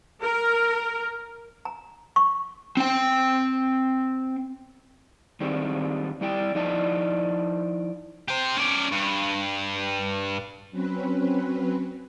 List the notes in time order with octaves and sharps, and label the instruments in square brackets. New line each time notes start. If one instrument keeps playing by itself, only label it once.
[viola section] A#4
[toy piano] A#5
C#6
[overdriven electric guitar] C4 G5
[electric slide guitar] D#3 G3 G#3 C4 D4
G3 E4 D5 G5
F3 D#4 E4 D5 D#5 A5
[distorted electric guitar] G4 C5
C#4 D5
G2
[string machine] F#3 C4 C#4 B4